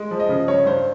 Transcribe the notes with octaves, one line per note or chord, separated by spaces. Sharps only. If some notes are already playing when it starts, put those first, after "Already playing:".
Already playing: G#3
F3
D#5
C#3
G2 C#5
G2 C5